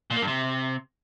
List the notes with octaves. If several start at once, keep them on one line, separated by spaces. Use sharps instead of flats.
A#2
A#3
G2
C3